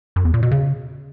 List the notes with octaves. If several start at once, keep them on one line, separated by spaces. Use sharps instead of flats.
F#2
E2
A#2
B2
C#3